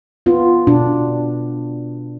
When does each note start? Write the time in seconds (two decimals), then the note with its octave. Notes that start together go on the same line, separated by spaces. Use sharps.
0.26 B3 F4
0.67 B2 D4